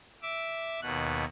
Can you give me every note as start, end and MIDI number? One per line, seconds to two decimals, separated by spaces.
0.22 0.80 76
0.22 0.80 86
0.82 1.25 39
0.82 1.25 47
0.82 1.25 59
0.82 1.25 90